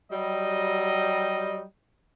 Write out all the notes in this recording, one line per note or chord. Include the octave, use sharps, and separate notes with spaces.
F#3 G3 D#5